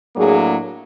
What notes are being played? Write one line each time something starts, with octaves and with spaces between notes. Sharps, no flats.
A2 F#3 A#3 D4 G#4